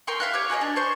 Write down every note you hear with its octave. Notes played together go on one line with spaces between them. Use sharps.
A#4 G5 C6 C#6
E5 F5 F#6
G4 C#5
F#4 G#4 A#4 D#5
D4
C5 C#6